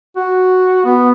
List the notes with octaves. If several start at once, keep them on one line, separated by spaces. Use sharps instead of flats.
F#4
B3